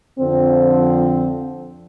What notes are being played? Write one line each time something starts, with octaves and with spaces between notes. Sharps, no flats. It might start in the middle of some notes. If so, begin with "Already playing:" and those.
F2 D3 F3 C4